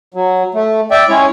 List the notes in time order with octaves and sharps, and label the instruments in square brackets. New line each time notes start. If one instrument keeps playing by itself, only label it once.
[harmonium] F#3
A3
D5 E5 G5
G#3 C#4 E4 C#5